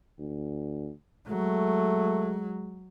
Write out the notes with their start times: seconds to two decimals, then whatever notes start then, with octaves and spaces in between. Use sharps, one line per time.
0.19 D2
1.28 F#3 G#3 A3